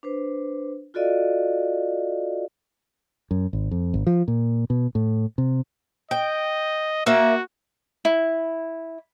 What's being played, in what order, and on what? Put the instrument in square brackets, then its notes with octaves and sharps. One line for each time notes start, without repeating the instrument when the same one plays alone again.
[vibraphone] D4 B4 C5
F4 F#4 A4 D5 D#5 F5
[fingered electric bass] F#2
G#1
F2
G#1
F3
A#2
B2
A2
C3
[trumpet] D#5 [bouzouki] G5
[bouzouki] A#3 E5 [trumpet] F#4
[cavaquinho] E4